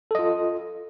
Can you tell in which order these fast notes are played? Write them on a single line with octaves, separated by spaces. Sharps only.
A4 D#5 F4